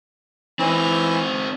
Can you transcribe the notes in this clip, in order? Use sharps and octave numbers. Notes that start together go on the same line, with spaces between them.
E3 C4 D#4